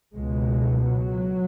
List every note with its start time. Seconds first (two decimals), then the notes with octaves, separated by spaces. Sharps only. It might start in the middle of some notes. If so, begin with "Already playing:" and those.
0.14 C#2 B2 G#3
0.86 F#3